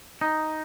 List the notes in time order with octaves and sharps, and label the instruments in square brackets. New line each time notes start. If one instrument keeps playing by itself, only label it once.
[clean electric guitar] D#4